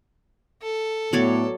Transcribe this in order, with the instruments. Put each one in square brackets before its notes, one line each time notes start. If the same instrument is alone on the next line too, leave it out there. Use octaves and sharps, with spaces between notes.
[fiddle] A4
[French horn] A2 [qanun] F#3 C#5 D5 [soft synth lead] B3